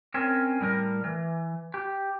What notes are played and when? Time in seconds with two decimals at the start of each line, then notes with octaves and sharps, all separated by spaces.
0.14 C4 C#4 A#4
0.61 A2 G3 A#4
1.04 E3
1.74 G4